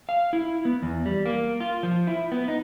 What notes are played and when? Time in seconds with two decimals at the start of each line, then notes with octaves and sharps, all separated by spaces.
0.09 F5
0.33 E4
0.65 B3
0.82 E2
1.06 G3
1.26 A#3
1.60 F4
1.83 F3
2.07 E4
2.32 B3
2.48 D#4